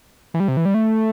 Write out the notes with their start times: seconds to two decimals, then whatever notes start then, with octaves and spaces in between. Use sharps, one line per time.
0.34 E3
0.40 G3
0.48 C3
0.57 E3
0.65 G3
0.74 A3